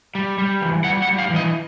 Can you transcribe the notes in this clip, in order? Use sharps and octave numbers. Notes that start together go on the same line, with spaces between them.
G3
G3
E3
G3 F#5
F#5
G3
F5
E3
D#5